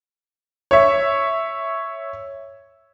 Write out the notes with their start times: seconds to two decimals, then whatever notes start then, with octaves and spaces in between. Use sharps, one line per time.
0.71 C#5 E5